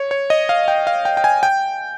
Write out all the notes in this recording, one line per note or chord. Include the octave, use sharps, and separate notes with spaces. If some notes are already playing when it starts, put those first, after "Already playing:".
Already playing: C#5
C#5
D#5
F5
G5
F5
G5
G5
G#5
G5